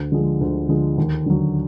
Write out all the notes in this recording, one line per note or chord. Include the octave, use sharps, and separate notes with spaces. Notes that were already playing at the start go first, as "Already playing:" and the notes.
Already playing: D2
D3 F3 G#3
D2
D3 F3 G#3
D#2
D3 F#3